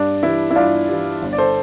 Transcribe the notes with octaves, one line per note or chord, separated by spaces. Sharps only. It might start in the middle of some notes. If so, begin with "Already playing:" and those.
Already playing: G2 D4
E3 G3 E4
E4
G2 D4 F4
E3 G3
G1
D5
A4 C5